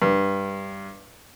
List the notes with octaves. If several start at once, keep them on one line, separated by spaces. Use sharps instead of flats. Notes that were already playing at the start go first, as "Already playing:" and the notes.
G2